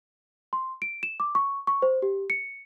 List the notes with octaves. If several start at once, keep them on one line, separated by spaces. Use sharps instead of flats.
C6
D7
E7
D6
C#6
C#6
C5
G4
C#7